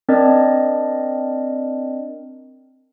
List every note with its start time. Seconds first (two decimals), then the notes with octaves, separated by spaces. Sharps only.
0.09 C4 D4 A#4 D5 D#5